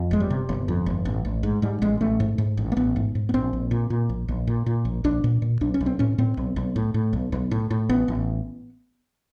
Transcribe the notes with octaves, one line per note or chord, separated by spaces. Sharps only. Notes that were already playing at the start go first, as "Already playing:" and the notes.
Already playing: F2
G1 G#3
G3
C3
G1
F2
G1
A1
A1
G#2
G#2 G3
A1 G#3
A1 A3
G#2
G#2
A1
A#3
A1 B3
G#2
G#2
B3
A#1 C4
A#1
A#2
A#2
A#1
A#1
A#2
A#2
A#1
A#1 D4
A#2
A#2
B1 D4
C#4
B1
C4
A2 C#4
A2 C4
B1
B1
A2
A2
B1
B1
A2
A2
A1 B3
A1